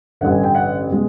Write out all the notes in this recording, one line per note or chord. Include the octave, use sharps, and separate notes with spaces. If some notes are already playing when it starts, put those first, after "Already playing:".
A1 G2 D3 F#5
G#5
G5
F#5
B2 G#3